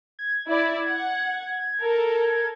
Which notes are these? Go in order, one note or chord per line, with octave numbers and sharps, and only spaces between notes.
G#6
E4 D5
F#5
A4 A#4